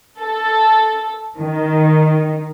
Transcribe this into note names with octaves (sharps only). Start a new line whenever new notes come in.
A4
D#3